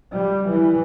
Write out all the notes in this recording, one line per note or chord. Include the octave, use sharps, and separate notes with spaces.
G3
E3